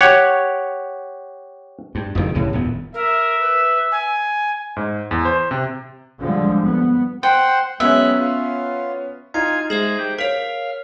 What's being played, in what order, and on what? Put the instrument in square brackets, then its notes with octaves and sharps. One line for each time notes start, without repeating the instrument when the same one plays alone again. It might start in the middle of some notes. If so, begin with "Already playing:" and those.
[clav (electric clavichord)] G4 C#5 F#5
[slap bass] G2
F#1 F2 A#2 D#3
C2 A2 C#3 E3
D#1 F#2 C3 B3
[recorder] A#4 [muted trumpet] E5
[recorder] B4
G#5
[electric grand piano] G#2
E2
C5
C3
[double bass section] D3 F3 G3 G#3
B3
[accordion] C5 F#5 C6 [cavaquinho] G5
[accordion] F#3 G#3 F#6 [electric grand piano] B3 C#4 [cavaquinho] E5
[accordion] F4
[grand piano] D#4 [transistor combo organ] F4 G#5 [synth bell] A#5
[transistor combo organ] G#3 [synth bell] G#4 C5 E5
[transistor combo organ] G4
[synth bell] A#4 C#5 [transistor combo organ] F5 [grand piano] B6